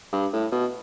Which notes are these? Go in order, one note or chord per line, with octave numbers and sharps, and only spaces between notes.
G2
A2
B2